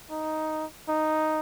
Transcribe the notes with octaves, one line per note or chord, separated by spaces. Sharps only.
D#4
D#4